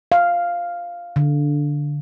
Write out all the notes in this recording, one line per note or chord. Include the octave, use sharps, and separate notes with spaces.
F5
D3